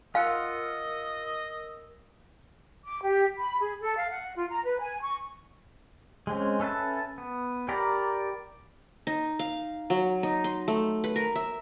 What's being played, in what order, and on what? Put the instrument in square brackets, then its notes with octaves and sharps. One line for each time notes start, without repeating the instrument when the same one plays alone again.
[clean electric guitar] F4 F#5 [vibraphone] A#4 E6 [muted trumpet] D#5 [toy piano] F5
[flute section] D6
G4
B5
G#4
A4
F5
F#5
F4
A#5
B4
G#5
C#6
[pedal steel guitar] G#3 C4 C#4
C#4 A4 B4 E5 A5
B3
G4 A#4 D5 A#5 B5
[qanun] D#4
F5
F#3
D#4
C6
A3
B4
A#4
E5